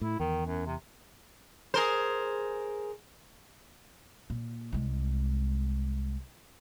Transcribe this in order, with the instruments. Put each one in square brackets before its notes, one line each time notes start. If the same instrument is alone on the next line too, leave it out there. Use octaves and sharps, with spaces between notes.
[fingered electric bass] A2 [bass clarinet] E4
[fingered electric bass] E2 [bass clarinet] D#3
[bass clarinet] F#2
C3
[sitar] G#4 A#4 C5
[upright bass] A#2
C2 G#3